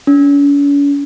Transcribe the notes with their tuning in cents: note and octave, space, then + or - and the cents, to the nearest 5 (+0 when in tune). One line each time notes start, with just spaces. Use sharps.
C#4 +45